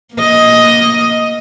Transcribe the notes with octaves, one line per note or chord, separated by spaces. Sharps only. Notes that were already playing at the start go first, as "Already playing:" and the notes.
A#3 D#5